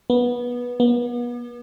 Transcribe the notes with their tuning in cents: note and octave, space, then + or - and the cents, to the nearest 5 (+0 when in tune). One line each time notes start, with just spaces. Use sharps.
B3 -15
B3 -35